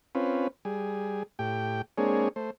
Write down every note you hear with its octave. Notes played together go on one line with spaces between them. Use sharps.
C4 C#4 F4 B4
G3 G#4
A2 G4 G5
G#3 A#3 C4 D4 G#4 C#5
A3 C5